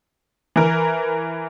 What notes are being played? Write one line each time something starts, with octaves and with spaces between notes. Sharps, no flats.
E3 A#4